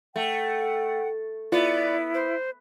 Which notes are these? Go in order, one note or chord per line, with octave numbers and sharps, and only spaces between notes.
A3 F#5 G5
B3 E4 F4 D5
C5